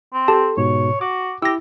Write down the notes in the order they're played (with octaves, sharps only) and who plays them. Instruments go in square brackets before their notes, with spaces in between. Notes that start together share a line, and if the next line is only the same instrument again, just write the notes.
[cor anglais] C4
[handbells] G4 A5 [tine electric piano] A4
[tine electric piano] G#2 B2 [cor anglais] C#5
[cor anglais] F#4 [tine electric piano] D6
[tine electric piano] E4 [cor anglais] G4 [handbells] E6 A#6